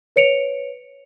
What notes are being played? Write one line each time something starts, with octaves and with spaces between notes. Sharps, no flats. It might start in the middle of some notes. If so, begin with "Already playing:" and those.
B4 C#5 C#7 D7 F7